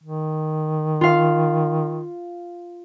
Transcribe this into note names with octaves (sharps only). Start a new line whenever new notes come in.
D#3
F4 F5